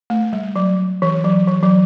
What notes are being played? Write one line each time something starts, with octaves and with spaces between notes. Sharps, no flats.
A3
G3
F#3
E3
F#3
E3
F#3